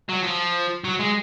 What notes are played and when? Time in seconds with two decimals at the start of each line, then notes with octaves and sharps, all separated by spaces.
0.09 F#3
0.23 F3
0.84 F#3
1.00 G#3